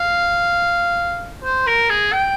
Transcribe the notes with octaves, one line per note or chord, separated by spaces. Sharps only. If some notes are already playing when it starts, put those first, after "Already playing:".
Already playing: F5
C5
A#4
G#4
G5